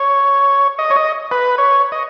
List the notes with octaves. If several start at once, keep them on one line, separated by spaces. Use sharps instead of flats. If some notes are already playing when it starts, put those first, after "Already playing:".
Already playing: C#5
D#5
C#5
D#5
B4
C#5
D#5